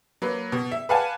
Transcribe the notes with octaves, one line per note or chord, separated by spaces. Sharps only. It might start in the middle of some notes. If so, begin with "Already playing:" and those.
F#3 A#3 B4
B2
E5
B4 D5 F5 F#5 G#5 A5